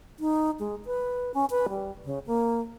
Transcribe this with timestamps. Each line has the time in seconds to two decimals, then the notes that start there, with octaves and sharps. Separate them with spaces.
0.20 D#4
0.59 G#3
0.86 B4
1.34 C#4
1.50 B4
1.69 G3
2.05 C#3
2.26 A#3